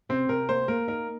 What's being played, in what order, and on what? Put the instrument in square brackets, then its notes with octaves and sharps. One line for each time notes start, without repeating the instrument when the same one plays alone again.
[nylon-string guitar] C3 [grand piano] C4
[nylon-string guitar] C3 [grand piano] A#4
[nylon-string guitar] A#3 [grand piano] C5
[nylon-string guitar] A#3 [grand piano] A#4
[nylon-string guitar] D#4 [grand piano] A#4